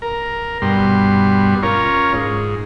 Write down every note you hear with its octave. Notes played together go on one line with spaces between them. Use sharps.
A#4
G2 B2 G3 C6
C#4 F4 A#4 C#5
G#2